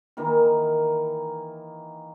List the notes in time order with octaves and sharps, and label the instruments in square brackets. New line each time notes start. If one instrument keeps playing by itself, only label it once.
[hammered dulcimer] D#3 E3 A#3